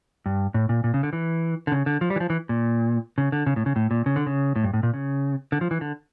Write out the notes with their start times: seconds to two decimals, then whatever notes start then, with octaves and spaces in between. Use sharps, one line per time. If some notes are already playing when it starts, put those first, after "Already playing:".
0.26 G2
0.54 A2
0.69 A#2
0.84 A#2
0.94 C#3
1.03 D3
1.13 E3
1.67 D3
1.72 C#3
1.86 D3
2.01 F3
2.10 G3
2.16 E3
2.20 F3
2.30 E3
2.49 A#2
3.18 C#3
3.32 D3
3.46 C#3
3.56 A2
3.66 C#3
3.76 A2
3.91 A#2
4.06 C#3
4.16 D3
4.26 C#3
4.56 A2
4.64 G2
4.74 A2
4.83 A#2
4.94 C#3
5.52 D3
5.61 F3
5.71 E3
5.81 D3